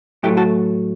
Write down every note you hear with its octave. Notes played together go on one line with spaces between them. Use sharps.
A2 F#3 A3 E4 G4
F#4 A4